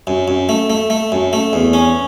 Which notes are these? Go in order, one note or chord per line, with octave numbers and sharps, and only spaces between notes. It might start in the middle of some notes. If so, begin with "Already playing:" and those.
F#2
F#2
A3
A3
A3
F#2
A3
E2
C#4